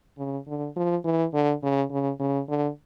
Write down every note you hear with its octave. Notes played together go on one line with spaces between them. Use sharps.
C#3
D3
F3
E3
D3
C#3
C#3
C#3
D3